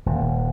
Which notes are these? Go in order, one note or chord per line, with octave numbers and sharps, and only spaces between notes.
D#1